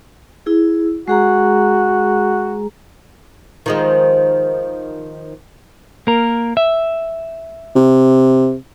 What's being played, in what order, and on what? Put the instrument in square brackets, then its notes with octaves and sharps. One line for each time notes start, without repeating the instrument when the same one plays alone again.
[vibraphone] E4 G#4
[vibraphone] G#3 G#4 A#5 [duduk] F#4
[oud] D#3 F3 G#3
[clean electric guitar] A#3 A#4
E5
[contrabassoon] C3